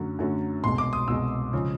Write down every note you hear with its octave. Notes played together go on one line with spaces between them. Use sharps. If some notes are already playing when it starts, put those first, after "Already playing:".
Already playing: F#2 D3 F#3 A3
F#2 D3 F#3 A3
C2 B2 G#3 C6
D6
D#6
C2 B2 G#3 E6
C#3 F3 G#3